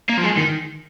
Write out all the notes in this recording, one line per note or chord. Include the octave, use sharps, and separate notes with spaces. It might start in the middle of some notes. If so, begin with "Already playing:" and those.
A#3
F3
G#3
D#3